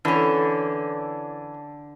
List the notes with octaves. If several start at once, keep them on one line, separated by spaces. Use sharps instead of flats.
D3 E3 C#4